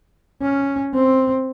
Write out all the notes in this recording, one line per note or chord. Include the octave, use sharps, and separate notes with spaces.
C#4
C4